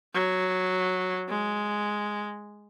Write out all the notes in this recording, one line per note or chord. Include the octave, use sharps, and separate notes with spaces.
F#3
G#3